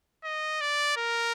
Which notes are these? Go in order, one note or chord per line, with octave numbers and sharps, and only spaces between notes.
D#5
D5
A#4